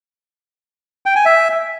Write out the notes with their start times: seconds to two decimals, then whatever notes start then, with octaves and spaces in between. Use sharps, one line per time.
1.06 G5
1.16 G#5
1.25 E5